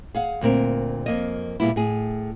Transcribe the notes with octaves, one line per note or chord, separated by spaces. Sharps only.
G#4 F5 F#5
D2 A#2 C4 A#4
F2 A#3 D#5
A#2 G3 G#3 B3 E4
A2 G#4